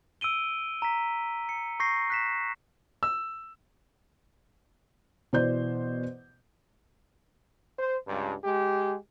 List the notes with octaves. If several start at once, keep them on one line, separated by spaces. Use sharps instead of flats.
E6 D7 D#7 G7
A#5 B6
C#7
C#6 G6 A#6 C7
F#6 B6 E7
E6
B2 E3 C5 D5 G6
C5
C#2 G2
G#3 G4